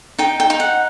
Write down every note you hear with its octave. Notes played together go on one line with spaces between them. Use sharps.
D#4 G5
G5
D#4
F#5